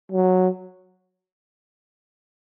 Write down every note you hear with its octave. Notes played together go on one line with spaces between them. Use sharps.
F#3